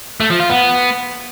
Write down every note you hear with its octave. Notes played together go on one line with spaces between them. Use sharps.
A3
F3
F4
B3